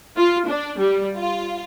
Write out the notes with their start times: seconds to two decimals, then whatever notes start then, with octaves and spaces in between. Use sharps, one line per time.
0.17 F4
0.47 D4
0.78 G3
1.16 F4